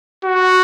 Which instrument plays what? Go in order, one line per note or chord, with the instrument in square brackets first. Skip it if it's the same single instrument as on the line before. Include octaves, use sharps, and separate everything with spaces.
[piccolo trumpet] F#4